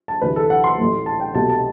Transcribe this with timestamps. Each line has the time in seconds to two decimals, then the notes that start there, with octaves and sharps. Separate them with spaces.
0.08 A5
0.22 D2 C3 E3 B4
0.36 A4
0.50 F#5
0.64 C6
0.78 A1 A2 E3 A3
1.06 A5
1.20 G5
1.35 C2 B2 F#3 A3 A5
1.49 A5